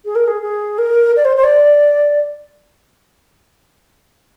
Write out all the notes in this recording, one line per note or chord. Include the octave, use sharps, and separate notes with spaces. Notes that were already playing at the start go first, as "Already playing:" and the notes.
G#4
A#4
G#4
G#4
A#4
D5
C5
C5
D5